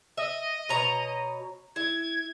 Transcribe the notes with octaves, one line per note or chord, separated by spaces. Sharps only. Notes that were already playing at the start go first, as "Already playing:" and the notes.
D#5 E5
B2 C#5 A#5
E4 G#6